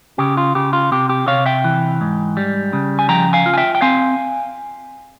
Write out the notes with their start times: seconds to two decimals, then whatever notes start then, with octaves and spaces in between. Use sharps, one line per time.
0.18 C#3 G4
0.37 F4
0.55 C#3 G4
0.73 F4
0.92 C3 G4
1.09 G4
1.27 C3 C#5 F5
1.46 E5 G5
1.64 E3
2.01 G#2
2.37 G3
2.73 C#3
2.99 G#5
3.09 F3 G5 A#5
3.33 F5 G#5
3.46 F4
3.54 G#5
3.57 E5 G5
3.75 G5
3.81 C4 F5 G#5